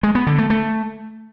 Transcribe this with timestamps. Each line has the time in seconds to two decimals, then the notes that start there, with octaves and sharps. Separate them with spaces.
0.03 G#3
0.15 B3
0.27 D3
0.38 A3
0.50 A3